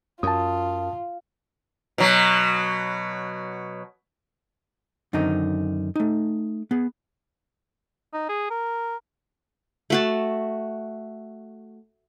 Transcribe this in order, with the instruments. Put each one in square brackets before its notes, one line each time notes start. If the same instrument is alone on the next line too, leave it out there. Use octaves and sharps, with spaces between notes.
[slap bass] F#2 [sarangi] F4 [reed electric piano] A5 D#6
[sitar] B2 F#3
[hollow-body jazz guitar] F#2 D3 D#3 C4 D#4 A#5
A3 D#4
B3 G#4
[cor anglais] D#4
G#4
A#4
[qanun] A3 F#4 A5